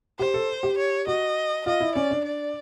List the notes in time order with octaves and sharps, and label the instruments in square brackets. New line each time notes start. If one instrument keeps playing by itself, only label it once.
[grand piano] G4 [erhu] C5
[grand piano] A4
G4
[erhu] C#5
[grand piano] F#4 [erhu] D#5
[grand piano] F4 [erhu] D#5
[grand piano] E4
[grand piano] C#4 [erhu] D5
[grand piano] D4
[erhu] D5